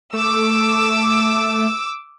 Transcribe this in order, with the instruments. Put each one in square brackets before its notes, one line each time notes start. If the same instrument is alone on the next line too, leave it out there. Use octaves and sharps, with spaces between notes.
[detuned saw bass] A3 [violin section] D6 E6